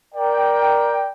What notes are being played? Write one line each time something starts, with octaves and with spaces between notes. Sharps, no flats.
A#4 D5 G5